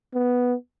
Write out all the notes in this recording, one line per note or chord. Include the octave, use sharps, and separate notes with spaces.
B3